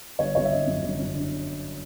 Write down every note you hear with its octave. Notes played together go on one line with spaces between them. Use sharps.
G1 C#5
G1 C#5
E5
G1 D#5
F#2
G1
F#2
D3